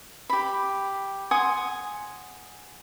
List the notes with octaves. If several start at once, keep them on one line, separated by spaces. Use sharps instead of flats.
G4 B5
F#5 G#5 C6 D#6